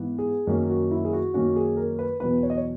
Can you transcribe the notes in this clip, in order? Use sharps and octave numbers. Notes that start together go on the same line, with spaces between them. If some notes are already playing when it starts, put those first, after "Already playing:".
Already playing: G#2 E3 B3
G#4
F#2 D#3 F#3 A#3 C#4
F#4
E4
G#4
F#4
F#2 D#3 F#3 A#3 C#4 F#4
G#4
A#4
B4
E2 B2 F#3 B4
C#5
D#5
C#5